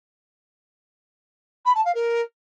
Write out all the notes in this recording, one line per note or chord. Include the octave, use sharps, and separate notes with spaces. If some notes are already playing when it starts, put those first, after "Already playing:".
B5
A5
F5
A#4